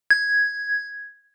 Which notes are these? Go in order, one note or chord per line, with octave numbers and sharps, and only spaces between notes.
G#6